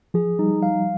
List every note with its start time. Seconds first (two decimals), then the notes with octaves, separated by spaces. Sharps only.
0.14 F3 G#4
0.39 G3 D#4
0.63 F5